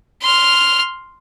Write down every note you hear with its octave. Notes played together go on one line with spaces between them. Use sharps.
C6 F6